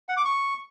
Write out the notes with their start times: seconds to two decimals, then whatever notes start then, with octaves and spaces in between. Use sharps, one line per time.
0.09 F#5
0.17 D6
0.25 C#6